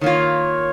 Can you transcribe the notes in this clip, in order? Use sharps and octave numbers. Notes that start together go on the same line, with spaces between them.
D#3 A#3 F4 C#5